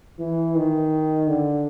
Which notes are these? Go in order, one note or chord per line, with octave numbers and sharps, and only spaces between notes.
E3
D#3
D3